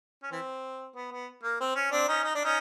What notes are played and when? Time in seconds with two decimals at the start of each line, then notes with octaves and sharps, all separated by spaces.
0.23 C#4
0.32 E3 C4
0.95 B3
1.12 B3
1.43 A#3
1.60 C4
1.76 C#4
1.92 C4 D4
2.08 C#4 D#4
2.24 D#4
2.35 D4
2.44 C#4 D#4